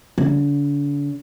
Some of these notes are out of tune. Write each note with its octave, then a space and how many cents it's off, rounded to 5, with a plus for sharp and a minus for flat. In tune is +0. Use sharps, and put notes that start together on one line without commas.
D3 -40